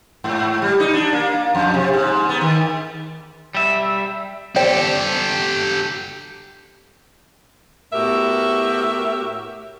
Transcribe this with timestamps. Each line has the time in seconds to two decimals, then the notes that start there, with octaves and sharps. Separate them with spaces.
0.24 G#2
0.62 G3
0.80 D#4
0.93 D4
1.13 A#3
1.55 F2
1.74 C3
1.94 G#2
2.29 B3
2.41 D#3
3.55 G3 E5
4.56 G4 A4 C5 D5 G5
7.93 A2 B3 F#4 G4 A#4 E5